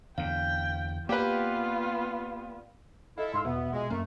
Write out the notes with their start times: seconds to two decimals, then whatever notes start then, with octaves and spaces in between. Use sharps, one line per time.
0.18 E2 D3 F5 G5
1.09 A#3 B3 F4 G4 B4 D5 F5 G5
3.18 E4 A4 D#5 F5
3.34 G#2 F5 C6 E6
3.45 E2 B2 B3 E5
3.73 A#1 G#3
3.90 F#2 A3 A#3